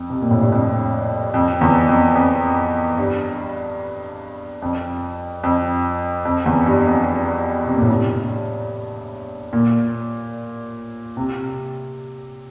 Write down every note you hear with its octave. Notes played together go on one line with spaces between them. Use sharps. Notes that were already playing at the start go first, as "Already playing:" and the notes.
Already playing: F2
C3
A#2
A2
G2
F2
F2
E2
F2
F2
G2
F2
F2
F2
E2
G2
F2
C3
A#2
A2
G2
A#2
C3